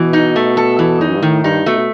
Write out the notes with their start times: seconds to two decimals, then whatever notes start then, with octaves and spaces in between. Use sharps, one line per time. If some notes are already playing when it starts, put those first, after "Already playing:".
Already playing: B2 E3
0.13 D#4
0.36 A3
0.57 A4
0.79 E3
1.00 E2 D#4
1.08 F#2
1.15 G2
1.22 A2 D#3
1.44 G2 D#4
1.66 B2 A3
1.78 B2